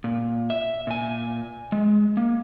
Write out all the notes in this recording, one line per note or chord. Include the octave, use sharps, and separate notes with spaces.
A#2
E5
A#2 G#5
G#3
A#3